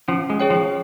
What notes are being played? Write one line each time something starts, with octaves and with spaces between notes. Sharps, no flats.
F3 C#4
G#3
G#4 C#5 G5
F3